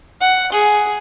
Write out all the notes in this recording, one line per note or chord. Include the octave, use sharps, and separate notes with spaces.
F#5
G#4